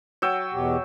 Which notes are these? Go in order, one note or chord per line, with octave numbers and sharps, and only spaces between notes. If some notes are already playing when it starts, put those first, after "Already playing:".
F#3 G5 E6
E2 B2 G4